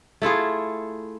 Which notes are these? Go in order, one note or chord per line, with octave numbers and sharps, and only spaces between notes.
A3 E4 F4 G#4